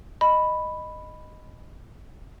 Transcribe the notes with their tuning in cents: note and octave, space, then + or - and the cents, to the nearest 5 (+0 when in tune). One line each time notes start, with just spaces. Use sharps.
D#5 -10 B5 +0